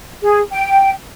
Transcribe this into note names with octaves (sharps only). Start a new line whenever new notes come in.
G#4
G5